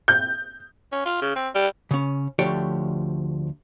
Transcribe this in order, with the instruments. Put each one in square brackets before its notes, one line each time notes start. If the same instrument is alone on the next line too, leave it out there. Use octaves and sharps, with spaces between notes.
[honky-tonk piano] G6
[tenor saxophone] C#4
F4
C#3
C4
G3
[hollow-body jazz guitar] C#3 C#4
D2 F3 A3 G4 C#5 D5